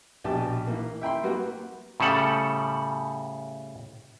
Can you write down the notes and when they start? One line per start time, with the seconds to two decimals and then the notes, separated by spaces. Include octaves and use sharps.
0.24 A#1 B2 G4 A5
0.67 E3 A#3
1.01 E5 G5 B5 C6
1.24 G3 A#3 B3 F#4
2.00 A2 C#3 G3 A4 F#5